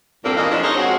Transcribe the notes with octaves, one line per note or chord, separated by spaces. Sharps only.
E2 G2 A#2 A#3 C4 A4
A#2 E3 A#3 A#4 D#5
F2 F3 F#3 G#3 D4
D#4 G#4 A#4 C5 C#5 D#5
F2 G#3 C4 F#4